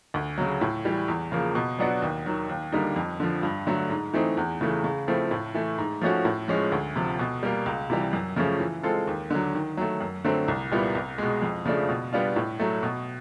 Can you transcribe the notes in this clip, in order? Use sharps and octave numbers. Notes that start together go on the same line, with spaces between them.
D2
C#3 F#3
A2
E3 G3
E2
C#3 F3 A#3
B2
F#3 B3 D4 F#4
D#2
D#3 F#3
D#2
D3 G3 A#3 D#4
F2
D3 F3
G2
D3 F#3 A3
G#2
E3 A3 C4 D#4
E2
C#3 E3 A3
C#3
F3 A3 C4 E4
A2
E3 A3
G#2
F3 A3 C#4 F#4
A2
F3 G#3 C#4
D2
C3 F3
B2
G3 A#3
C#2
C3 E3 G3
F#2
C#3 F3 A3 C#4
E3
G#3 C4 F4 A4
D#2
D3 F#3
D#3
F#3 A3
F#2
D3 F#3 A3 C4
C2
A#2 G3 B3 E4
C2
B2 G#3
F2
C#3 F3 A3 D4
B2
G3 B3 D4 F4
A2
F#3 A3
B2